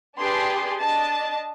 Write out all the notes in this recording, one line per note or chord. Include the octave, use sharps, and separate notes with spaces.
D4 G4 G#4 B4 A5 C6
D4 D#5 A5